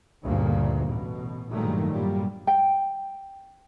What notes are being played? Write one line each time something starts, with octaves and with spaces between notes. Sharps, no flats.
D2 G2 A#2 C#3 A#3
A1 B2
G2 A#2 D#3 F#3 G#3 A3
G2 A#2 F#3 G3
G5